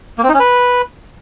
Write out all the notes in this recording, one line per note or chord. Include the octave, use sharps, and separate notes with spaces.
A#3
C4
D#4
C#4
B4